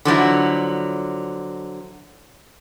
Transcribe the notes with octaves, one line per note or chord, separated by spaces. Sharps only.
D3 F3 F#3 E4